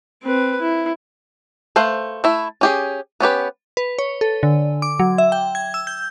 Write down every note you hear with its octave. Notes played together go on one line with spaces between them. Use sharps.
C4 B4
E4
A3 B4 C5 F5
A3 E4
C#4 G4 G#4
B3 C#4 G4 B4
B4
C#5
A4
D3
D6
F#3
E5
G5
G#6
E6
G6